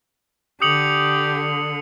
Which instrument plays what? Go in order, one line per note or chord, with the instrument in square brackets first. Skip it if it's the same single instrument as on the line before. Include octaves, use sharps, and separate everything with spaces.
[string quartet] D3 [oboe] G4 [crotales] D#6 C#7 F#7